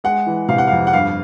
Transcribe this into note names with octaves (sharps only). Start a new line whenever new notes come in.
G#3 F#5
E3
C3 F5
F#5
F2 F5
F#5
G2 F5